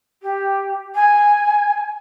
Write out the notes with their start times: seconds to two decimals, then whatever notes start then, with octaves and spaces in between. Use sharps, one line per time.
0.22 G4
0.95 G#5